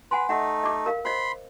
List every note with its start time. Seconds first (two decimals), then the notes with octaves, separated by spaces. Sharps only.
0.11 B4 F#5 G#5 C6
0.29 A3 D#4 E5 F#5
0.64 D#5 D6
0.86 A#4 F5
1.05 C5 D#5 B5 C6